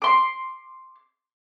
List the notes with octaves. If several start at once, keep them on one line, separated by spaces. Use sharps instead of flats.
C6 D6